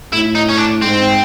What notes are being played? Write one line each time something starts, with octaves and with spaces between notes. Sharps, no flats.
A2 E4
D#4
C#4
D4
G#2 C4